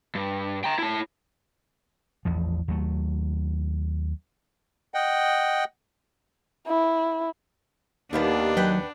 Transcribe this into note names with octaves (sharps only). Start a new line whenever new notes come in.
G2
G5 A#5
E4 A5
A1 E2 F3
D#2 F#3 A3
D#5 F#5 G5
E4
D#2 D#3 G3 A#3 B3 D4
F#3 B4 F#5 G5